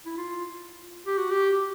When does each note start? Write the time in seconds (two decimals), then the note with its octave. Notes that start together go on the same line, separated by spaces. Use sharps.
0.06 E4
0.18 F4
1.07 G4
1.18 F#4
1.30 G4